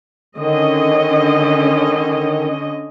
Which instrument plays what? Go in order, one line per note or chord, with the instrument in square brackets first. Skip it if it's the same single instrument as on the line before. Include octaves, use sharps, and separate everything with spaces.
[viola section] D3 C#4 D#5 [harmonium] D#3